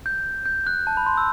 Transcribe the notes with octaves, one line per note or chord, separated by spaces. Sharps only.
G6
G6
F#6
A5
B5
C6
E6